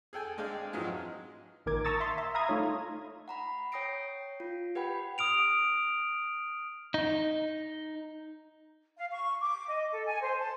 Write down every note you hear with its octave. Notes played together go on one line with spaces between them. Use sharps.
G#4 A4 G5 G#5
G#3 C4 D4 G#4 F5 G5
F2 G#2 E3 F#3 G#3 F4
A1 A#2 D#3 A#4 D6 G#6
A5 A#5 C#6 D#6 E6 A6
E5 C6
E5
E5 F5 A#5 B5 D#6 G#6
A3 D#4 F4 C#5
F#5 A#5 B5
C#5 G5 D#6 A#6 C7 D7
F4
G4 B4 F#5 G5 B5
D#6 F6 D7 F7
D#4
F5
C#6
D6
D#5
A4
G#5
C5
A5